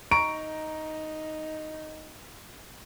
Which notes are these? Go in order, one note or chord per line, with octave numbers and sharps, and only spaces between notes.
D#4 A#5 C#6 D7